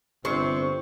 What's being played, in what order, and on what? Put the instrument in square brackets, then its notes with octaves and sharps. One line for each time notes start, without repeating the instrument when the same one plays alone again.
[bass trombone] G1 [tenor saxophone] C3 [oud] C5 [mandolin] C#6